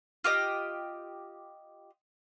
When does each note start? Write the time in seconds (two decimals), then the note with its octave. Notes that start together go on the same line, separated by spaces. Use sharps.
0.24 F4 G4 D#5